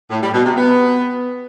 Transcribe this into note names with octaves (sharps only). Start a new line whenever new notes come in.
A2
G3
B2
C3
B3